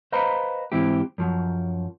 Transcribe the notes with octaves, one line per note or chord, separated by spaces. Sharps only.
B4 C5 D#5 F5 A#5 B5
G#2 E3 C4 E4 G4
F#2 F3 F#3